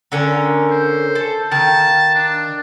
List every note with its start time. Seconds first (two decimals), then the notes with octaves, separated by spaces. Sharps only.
0.12 D3 C#4 A#4
0.71 C5
1.15 A4
1.52 D#3 F5 A5
2.15 D4